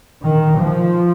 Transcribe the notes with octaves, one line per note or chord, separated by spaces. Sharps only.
D#3
F3